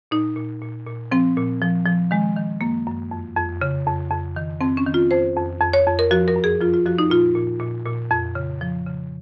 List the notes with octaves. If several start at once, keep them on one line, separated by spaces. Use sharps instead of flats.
A#2 D#4
A#2
A#2
A#2
F3 C4
A#2
F3
F3
D#3 G#3
D#3
F#2 A#3
F#2
F2
F2
C#3
F2
F2
D#3
F2 C4
C#4
D#3
F4
F2 C5
F2
F2
C#5
F2
A#4
F3 F#4
A#4
F#2
G#4
F3 F4
F4
F3 F#4
D#4
A#2 F4
A#2
A#2
A#2
F2
C#3
F3
C#3